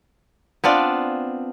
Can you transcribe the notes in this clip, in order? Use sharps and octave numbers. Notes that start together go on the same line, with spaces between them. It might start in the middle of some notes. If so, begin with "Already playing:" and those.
B3 C4 D4 F4